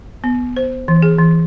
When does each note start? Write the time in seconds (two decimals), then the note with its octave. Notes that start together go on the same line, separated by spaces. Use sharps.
0.24 B3
0.56 C5
0.88 E3
1.02 G#4
1.19 E3